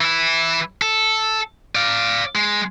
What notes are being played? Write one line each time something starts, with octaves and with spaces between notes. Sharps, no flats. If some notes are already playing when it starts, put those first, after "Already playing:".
E3 E4
A4
D5 F5
G#3